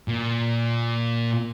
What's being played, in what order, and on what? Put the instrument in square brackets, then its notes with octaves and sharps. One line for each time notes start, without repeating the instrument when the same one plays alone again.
[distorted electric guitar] A#2